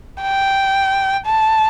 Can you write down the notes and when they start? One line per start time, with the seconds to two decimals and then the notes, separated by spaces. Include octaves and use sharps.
0.21 G5
1.26 A5